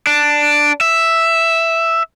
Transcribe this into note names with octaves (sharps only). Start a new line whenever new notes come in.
D4
E5